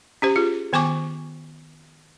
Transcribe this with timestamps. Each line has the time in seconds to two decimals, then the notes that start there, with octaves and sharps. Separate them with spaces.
0.22 C#4 G4 C5
0.36 F4 G#4
0.73 D#3 B3 C5 G#5 C#6 D6